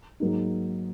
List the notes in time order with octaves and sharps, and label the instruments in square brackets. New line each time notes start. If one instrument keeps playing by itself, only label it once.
[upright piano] G#2 F#3 A#3 D#4